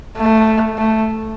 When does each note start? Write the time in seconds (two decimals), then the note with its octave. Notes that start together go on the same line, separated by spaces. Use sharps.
0.17 A3
0.78 A3